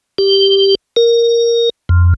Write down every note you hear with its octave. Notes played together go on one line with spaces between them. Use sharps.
G4
A#4
F2